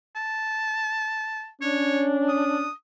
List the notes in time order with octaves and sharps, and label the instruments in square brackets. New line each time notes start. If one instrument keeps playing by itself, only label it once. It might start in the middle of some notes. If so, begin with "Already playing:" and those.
[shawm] A5
[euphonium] C#4 [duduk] D4 [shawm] C#5
[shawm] D#6